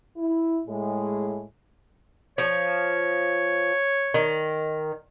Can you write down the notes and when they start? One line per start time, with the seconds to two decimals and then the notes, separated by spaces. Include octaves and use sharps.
0.16 E4
0.67 A2 G#3
2.38 F3 C#5
4.14 D#3